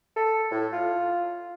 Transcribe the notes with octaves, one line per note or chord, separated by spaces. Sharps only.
A4
A2
F4